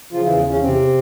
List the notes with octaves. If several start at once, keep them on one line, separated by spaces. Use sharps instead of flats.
C#3 F3 F4
E3 E4
E2
E2 C#3 C#4
E2 C3 C4